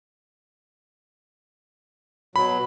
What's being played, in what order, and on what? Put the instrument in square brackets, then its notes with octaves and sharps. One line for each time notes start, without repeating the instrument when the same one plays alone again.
[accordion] B2 F#3 [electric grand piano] B5